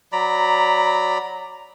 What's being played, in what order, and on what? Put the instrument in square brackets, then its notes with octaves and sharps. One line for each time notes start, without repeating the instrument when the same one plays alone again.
[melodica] F#3 D5 A#5 B5